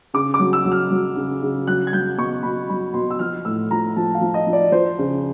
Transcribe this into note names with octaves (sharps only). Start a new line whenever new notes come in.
C#3 D6
D6
F#3
E6
F#3
F6
F#3
C#3
C#3
F#3 F#6
G#6
F#3 G6
B2 C#6
B2 B5
F#3 B5
B2 C6
E6
F3 F6
A2 E6
F3 A#5
F3 A5
F5
F3
D#5
F3
D5
F3 C5
C#3